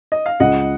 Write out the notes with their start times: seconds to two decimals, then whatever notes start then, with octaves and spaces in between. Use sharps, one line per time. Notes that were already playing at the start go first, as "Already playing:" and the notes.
0.12 D#5
0.26 F5
0.40 C#2 D#5 F#5